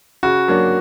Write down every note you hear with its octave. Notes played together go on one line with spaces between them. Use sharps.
C#3 F#4
F#3 A#3 D4